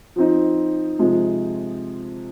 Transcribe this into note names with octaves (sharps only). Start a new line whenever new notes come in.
F3 C4 D#4
C3 F3 G#3